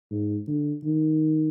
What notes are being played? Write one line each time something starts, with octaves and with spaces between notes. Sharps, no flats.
G#2
D3
D#3